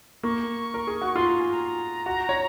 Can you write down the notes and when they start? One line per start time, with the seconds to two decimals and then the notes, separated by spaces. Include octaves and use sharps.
0.23 A#3 C#6
0.74 A#4
0.87 G#4
1.01 F#4
1.16 F4 C6
1.27 A#5
1.39 G#5
1.51 A#5
2.06 F#4
2.29 C#5